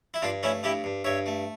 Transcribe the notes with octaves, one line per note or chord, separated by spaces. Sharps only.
E4
G2 D4 F4
A3 C#4 E4
G2 E4 G4
G2
G2 C#5 E5
A3